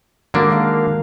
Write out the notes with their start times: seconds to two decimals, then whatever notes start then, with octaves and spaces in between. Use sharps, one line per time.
0.34 D3 D#3 G#3 A#3 D4 F#4
0.50 A#4 F5
0.87 D3